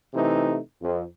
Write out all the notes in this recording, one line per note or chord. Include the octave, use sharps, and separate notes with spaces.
C3 E3 A3 D#4
F2